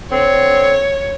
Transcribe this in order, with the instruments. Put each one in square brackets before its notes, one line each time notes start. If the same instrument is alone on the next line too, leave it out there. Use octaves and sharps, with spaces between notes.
[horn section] D3 C4 [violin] C#5